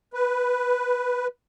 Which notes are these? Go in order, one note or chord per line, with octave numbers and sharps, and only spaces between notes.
B4